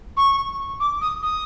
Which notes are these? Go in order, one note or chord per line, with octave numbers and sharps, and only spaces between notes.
C#6
D6
D#6
D#6